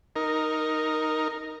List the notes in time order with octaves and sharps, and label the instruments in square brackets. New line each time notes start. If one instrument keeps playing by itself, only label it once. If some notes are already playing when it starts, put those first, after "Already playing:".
[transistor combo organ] D#4 A#4